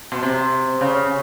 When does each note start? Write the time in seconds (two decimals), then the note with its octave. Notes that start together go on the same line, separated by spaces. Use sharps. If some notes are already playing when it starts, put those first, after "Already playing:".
0.12 B2
0.23 C3
0.81 C#3